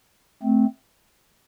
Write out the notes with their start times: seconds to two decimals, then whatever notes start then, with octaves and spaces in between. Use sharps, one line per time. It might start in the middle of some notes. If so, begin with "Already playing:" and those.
0.42 A3 C4